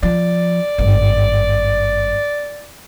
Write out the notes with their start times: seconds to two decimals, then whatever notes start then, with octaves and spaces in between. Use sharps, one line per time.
0.03 F3 D5
0.78 G#1 G2